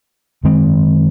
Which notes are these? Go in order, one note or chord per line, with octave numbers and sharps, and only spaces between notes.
F#2 D#3 G#3 C4